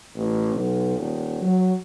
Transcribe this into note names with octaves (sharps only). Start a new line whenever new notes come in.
A1
B1
D#1
F#3